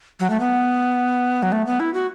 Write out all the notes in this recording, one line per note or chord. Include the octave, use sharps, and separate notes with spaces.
F#3
A3
B3
F#3
A3
B3
E4
F#4